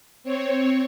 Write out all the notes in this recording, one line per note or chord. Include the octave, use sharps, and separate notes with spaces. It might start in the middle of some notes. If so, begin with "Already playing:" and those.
C4 C#5